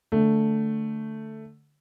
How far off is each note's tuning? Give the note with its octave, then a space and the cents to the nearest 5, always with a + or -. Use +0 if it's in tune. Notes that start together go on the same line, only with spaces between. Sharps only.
D3 +0 A3 +0